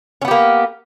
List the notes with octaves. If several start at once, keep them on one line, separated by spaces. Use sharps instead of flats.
A#3 B3 C#4 G4